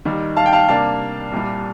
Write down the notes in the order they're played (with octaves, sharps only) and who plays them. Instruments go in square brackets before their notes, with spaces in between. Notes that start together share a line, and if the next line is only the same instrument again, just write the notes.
[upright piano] D#2 D#3 G3
[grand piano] F5 A5
G5
F5 A5
[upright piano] C3 G3 A#3 D4 [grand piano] F5 A5
[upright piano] C2 A#2 G3